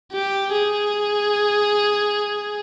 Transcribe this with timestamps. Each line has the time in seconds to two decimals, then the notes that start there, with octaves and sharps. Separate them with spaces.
0.12 G4
0.53 G#4